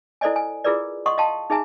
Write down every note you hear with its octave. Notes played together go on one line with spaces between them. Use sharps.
E4 A4 C5 D5 D#5 G#5
G#5
E4 F4 G#4 A#4 B4 D5
D#5 F#5 C6 C#6 D#6
D#5 F5 G5 A5 C6
D#4 G#4 E5 G#5 A#5